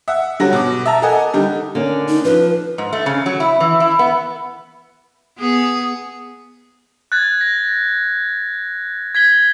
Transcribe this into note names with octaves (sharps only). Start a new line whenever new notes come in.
E5 F#5
D3 F#3 G3 F#4 A#6
B2 D6
E5 A5 A#5
A4 A#4 D#5 F#5 G#5
D3 G3 D#4
D3 A#3 C#4
D#4
F3 B4
G#2
A3
C#3
F#3
E4
E3
E4
B3
B3 G#4
F#6 G#6 A6
A#6
G#6 B6 G7